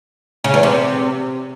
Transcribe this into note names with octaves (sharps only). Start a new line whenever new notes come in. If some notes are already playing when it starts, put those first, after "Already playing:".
C#3
E2
C3